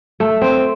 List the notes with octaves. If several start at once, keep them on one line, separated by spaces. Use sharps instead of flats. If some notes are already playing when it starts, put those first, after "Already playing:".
A3
C4